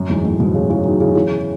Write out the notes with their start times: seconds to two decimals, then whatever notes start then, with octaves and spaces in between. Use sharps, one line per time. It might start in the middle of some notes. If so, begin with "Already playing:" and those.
Already playing: F#2
0.09 E2 G#2
0.24 F#2 A2
0.40 G#2 B2
0.54 A2 C#3
0.69 C#3 E3
0.85 D#3 F#3
1.00 C#3 E3
1.15 C#3 E3